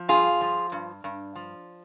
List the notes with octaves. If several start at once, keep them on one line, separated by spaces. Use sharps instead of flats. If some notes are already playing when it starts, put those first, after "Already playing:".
Already playing: F3
G2 F4 G#4
F3
G2
G2
F3